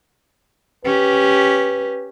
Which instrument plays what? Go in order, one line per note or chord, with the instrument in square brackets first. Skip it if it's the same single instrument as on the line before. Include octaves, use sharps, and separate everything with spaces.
[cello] C#4 G4 [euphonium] B4